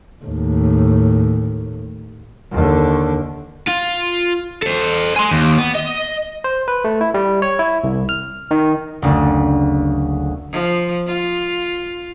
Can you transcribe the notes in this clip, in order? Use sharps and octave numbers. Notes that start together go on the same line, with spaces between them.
D#2 A2
D#2 D3
F4
A4 C5
G#5 C6
D#2
B3
D#5
C5
B4
A3
E4
G3
C#5
E4
C2
F6
D#3
F#1 D2
F3
F4